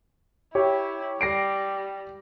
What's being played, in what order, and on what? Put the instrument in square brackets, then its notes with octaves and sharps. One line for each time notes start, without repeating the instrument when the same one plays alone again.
[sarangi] E4 [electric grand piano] G4 C#5
[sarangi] G3 [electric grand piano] A#6 C7 D7